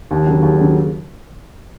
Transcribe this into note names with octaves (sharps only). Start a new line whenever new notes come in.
D#2
C#3 F#3
D#2
C#3 F#3